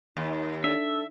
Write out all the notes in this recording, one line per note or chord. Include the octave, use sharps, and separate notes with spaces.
D#2 D#4
D4 A4 E5